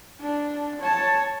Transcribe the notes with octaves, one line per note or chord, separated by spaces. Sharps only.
D4
C#5 A5